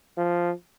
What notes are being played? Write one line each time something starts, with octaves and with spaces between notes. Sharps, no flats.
F3